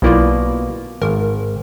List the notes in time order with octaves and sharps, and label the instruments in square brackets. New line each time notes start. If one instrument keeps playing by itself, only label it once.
[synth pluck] B1 E4 F4 [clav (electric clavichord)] B2 A#3 D5
[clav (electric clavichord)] G#1 [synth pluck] A#4